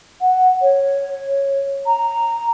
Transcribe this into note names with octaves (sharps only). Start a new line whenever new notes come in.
F#5
C#5
A#5